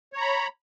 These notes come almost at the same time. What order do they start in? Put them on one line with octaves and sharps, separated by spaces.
C#5 A#5 B5